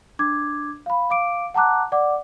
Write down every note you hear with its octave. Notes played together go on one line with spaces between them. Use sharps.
D4 D6 G#6
F5 B5
F5 D6 D7
F#5 A5 A#5 D6 F#6
D5 F#5 D6